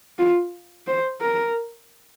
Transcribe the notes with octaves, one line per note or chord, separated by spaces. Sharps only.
F4
C5
A#4